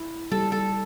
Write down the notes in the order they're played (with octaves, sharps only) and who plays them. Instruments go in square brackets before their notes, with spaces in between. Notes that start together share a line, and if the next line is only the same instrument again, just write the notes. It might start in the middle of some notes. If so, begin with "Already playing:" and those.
Already playing: [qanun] E4
[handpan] G3 [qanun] A4
[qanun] A4